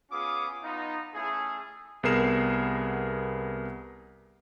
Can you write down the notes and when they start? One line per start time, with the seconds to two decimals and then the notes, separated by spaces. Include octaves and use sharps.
0.11 B3 C#4 F4 G#4 D6 D#6
0.63 B3 D#4 F4
1.15 A3 C#4 E4 G#4
2.03 C2 B3 G#4 A#4 C7 E7